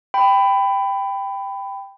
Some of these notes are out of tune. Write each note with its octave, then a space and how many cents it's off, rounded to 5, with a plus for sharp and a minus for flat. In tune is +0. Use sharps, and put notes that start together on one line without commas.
G5 +5 B5 +20